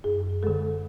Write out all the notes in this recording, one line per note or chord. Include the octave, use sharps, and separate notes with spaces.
F#2 G#4
D3 G#3 A4